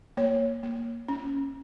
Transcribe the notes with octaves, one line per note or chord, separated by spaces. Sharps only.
A#3 C#5
A#3
C#4